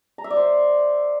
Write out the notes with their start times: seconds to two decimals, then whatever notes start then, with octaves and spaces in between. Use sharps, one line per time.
0.18 A#5
0.24 E5
0.30 D5
0.36 C5